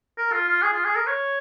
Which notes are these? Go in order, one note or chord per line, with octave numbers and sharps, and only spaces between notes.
A#4
F4
F4
G#4
F4
G#4
A#4
C#5